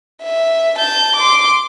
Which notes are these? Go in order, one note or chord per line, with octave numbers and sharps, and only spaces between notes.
E5
A5 G6
C6 D6